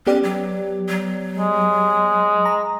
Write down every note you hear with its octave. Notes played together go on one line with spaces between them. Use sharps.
B3 C#4 G4 D5
F#3
F#3
G#3
A#5